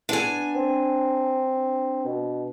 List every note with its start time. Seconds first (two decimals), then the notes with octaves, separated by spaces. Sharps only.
0.09 B3 D4 G#5
0.56 C4
2.05 B2